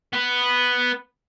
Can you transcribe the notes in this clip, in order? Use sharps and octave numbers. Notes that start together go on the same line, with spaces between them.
B3 B4